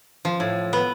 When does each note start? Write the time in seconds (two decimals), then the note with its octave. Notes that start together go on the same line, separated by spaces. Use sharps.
0.25 F3
0.40 A2
0.73 B3